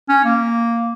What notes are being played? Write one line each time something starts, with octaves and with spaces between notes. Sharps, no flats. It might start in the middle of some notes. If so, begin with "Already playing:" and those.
C#4
A#3